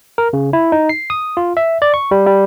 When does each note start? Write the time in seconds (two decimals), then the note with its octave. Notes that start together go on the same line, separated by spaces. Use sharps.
0.18 A#4
0.33 C#3
0.53 E4
0.72 D#4
0.89 C7
1.10 D#6
1.37 F4
1.57 E5
1.82 D5
1.94 C#6
2.11 G3
2.26 G3